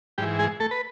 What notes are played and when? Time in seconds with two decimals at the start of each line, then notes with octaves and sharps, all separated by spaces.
0.18 G#2 E3 G3 G4
0.39 G#3 G#4
0.60 A3 A4
0.71 B4